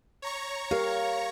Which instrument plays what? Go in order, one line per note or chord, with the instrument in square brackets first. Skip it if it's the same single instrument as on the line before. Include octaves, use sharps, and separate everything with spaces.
[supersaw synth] C#5 A#5 C#6
[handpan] G4 A#4 [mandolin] F5